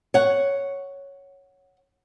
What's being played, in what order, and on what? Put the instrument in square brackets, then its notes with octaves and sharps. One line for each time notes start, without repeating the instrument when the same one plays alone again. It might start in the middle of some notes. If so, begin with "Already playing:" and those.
[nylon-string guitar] C#5 F#5